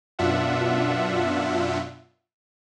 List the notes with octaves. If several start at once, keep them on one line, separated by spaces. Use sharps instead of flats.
F#2 B2 D4 F4 E5 F#5